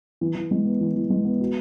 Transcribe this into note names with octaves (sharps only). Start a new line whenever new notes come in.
E3
E3
G#3
B3
E3
E3
G#3
B3
F#4